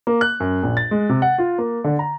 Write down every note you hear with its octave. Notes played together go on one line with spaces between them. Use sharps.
A#3
F#6
F#2
A#1
A6
G#3
C3
F#5
F4
A#3
D3
A#5